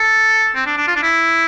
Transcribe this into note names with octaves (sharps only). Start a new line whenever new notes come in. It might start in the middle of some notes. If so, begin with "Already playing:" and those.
Already playing: A4
C4
D4
D4
F4
D4
E4